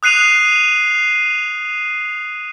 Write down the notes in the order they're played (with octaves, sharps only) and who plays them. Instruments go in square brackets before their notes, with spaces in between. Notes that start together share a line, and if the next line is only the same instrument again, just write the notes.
[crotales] D#6 F#6 C7 D#7 F7